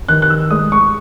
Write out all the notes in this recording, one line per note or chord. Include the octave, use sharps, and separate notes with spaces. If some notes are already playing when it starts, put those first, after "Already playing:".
D#3 F#6
F#6
E6
G#3 D#6
C#6